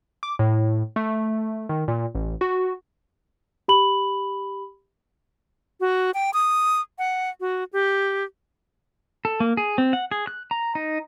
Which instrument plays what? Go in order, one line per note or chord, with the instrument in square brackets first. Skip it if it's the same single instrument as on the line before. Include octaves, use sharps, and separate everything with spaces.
[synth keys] D6
A2
A3
D#3
A#2
A1
F#4
[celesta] G4 B5 F#7
[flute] F#4
G5
D#6
F#5
F#4
G4
[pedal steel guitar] A4
A#3
G#4
C4
F#5
G#4
F#6
A#5
D#4